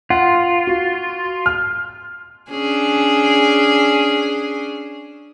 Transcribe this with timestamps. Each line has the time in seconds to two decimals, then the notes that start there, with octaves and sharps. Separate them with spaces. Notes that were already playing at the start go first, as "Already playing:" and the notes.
0.10 F4 F#5
0.67 F#4
1.46 F6
2.51 C#4 D4 G#4